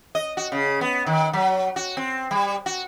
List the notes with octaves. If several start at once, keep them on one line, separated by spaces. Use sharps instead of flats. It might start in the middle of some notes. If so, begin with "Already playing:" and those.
D#5
F#4
C#3
B3
D#3
F#3
F#4
C4
G3
F#4